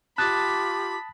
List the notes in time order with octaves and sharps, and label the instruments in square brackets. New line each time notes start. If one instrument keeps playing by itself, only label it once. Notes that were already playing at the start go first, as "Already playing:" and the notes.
[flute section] F4 G4 D6 [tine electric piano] A5 D#6 A6 [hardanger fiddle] B5 [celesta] F#6